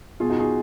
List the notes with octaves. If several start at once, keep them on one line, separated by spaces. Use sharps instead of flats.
B2 F4 G#4
D#4 F#4
F4 G#4